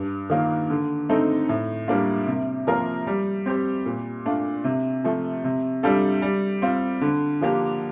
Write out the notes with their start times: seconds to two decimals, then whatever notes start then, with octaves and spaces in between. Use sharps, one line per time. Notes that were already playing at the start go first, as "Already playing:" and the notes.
Already playing: G2
0.30 D#3 A#3 F4
0.70 D3
1.09 A3 C4 D#4 A4
1.49 A2
1.88 G3 A#3 D4 F4
2.27 C3
2.67 F3 A#3 F4 A#4
3.07 G3
3.46 C4 G4 C5
3.86 A#2
4.25 A3 D4 F4
4.64 C3
5.04 F3 A3
5.44 C3
5.83 G3 D4 F4 A4
6.22 G3
6.62 C4 F4
7.01 D3
7.41 F3 A#3 D4 G4